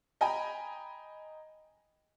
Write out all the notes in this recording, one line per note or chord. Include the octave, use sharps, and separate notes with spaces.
D#5 G5 G#5 A#5 B5